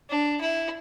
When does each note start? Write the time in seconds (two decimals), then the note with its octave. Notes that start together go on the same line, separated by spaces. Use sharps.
0.09 D4
0.41 E4